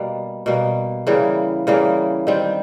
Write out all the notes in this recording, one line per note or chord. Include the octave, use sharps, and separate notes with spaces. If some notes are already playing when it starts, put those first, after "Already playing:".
Already playing: B2 G3 A#3
B2 G3 A#3
C#3 E3 G3 A#3
C#3 E3 G3 A#3
D#3 G3 C4